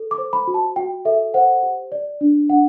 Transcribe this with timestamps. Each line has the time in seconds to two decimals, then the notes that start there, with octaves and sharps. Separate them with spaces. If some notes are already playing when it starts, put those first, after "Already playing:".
Already playing: A4
0.11 D6
0.18 C5
0.33 B5
0.48 F#4
0.54 A5
0.76 F#4 G5
1.05 A4 E5
1.34 C5 F#5
1.63 G4
1.92 D5
2.21 D4
2.50 D4 F#5